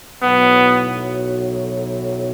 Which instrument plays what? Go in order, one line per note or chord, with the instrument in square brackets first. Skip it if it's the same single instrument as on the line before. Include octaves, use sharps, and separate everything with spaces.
[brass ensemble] B1 A2 F#3 [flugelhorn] B3